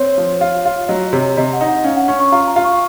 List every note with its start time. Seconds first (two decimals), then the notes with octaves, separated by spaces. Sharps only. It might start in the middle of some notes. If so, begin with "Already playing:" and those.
Already playing: C4 C#5
0.18 F3
0.41 F4
0.65 F4
0.88 F#3 D#5
1.13 C3 C#5
1.37 C3 D#5
1.53 F#5
1.61 D#4
1.68 F#5
1.84 C#4 F5
1.96 F#5
2.08 C#4 C#6
2.20 C#6
2.32 F4 A#5
2.48 A#5
2.56 F4
2.64 C#6